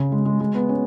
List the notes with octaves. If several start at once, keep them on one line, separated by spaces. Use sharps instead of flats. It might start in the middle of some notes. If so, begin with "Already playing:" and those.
Already playing: C#3
G#3
G#3
G#3
B3
C#4